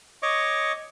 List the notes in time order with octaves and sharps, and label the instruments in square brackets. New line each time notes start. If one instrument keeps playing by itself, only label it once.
[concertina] C#5 D#5 C#6 D6